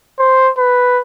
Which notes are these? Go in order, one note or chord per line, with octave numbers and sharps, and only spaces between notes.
C5
B4